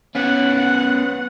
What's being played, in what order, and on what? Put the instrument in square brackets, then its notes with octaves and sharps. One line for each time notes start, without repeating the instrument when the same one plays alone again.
[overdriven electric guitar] B3 C#4 [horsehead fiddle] F#5